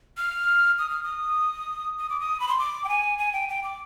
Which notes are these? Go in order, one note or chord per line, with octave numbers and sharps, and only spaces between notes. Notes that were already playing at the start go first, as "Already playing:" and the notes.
F6
D#6
F6
D#6
D#6
D6
D#6
B5
C6
D6
G5
G#5
G#5
G5
G5
D6